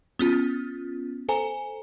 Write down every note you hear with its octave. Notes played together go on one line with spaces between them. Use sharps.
B3 C#4 F4
A4 C5 G#5 A#5